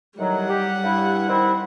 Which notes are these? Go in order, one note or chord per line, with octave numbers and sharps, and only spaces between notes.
A2 D#3 F#3 G3 F#5
G4
G2 E4
D#3 C4 E4